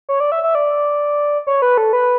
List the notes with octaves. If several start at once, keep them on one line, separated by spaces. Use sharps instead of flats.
C#5
D5
E5
E5
D5
C#5
B4
A4
B4